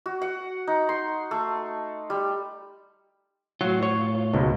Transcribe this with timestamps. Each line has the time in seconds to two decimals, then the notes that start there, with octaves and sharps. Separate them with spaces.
0.06 F#4
0.22 F#5
0.67 D#4
0.89 C6
1.31 A3
2.10 G3
3.61 A2 F#3 F4
3.83 C#5
4.33 C#2 G#2 B2